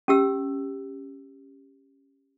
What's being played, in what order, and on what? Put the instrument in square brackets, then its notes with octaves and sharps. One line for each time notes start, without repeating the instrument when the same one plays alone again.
[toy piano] C#4 G4 E6